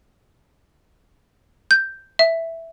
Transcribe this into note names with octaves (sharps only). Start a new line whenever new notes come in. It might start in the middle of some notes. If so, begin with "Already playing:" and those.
G6
E5